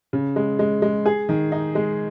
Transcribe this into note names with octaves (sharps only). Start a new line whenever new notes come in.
C#3
G#3
G#3
G#3
G#4
D#3
D#4
G#3